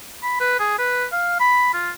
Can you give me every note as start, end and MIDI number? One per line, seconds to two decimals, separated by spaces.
0.23 0.37 83
0.40 0.55 71
0.59 0.78 68
0.79 1.05 71
1.12 1.39 77
1.40 1.70 83
1.73 1.90 65